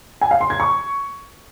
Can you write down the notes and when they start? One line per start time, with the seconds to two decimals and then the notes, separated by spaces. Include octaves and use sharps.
0.21 G#5
0.31 F5
0.41 C6
0.50 G#6
0.60 C#6